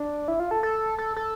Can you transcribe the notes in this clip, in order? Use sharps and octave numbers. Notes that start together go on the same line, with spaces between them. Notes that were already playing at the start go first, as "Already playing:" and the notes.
Already playing: D4
E4
F4
A4
A4
A4
A4